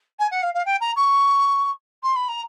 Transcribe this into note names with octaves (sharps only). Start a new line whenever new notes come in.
G#5
F#5
F5
F5
G5
A#5
C#6
C6
B5
A#5